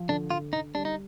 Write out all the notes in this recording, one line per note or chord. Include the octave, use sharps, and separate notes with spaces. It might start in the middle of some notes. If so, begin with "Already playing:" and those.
Already playing: F3
D3 D4
D3 F4
D3 D#4
G3 D4
D#4